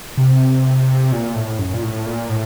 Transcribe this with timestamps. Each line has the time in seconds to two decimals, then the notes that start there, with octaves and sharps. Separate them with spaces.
0.17 C3
1.12 A#2
1.35 A2
1.59 F#2
1.74 A#2
1.83 A2
2.06 A#2
2.29 A2